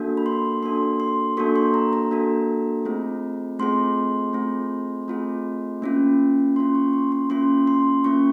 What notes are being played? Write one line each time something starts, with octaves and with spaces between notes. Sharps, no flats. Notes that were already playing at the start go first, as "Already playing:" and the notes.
Already playing: A#3 D4 F#4 A4
B5
C6
A#3 D4 F#4 A4 C6
C6
A#3 D4 F#4 A4 C#6
C6
A#5
A#5
A#3 D4 F#4 A4
A3 C4 F4 G#4
A3 C4 F4 G#4 C6
A3 C4 F4 G#4
A3 C4 F4 G#4
A#3 C#4 F4
A#3 C#4 F4 C6
C#6
C6
C6
A#3 C#4 F4 C6
C6
A#3 C#4 F4 C#6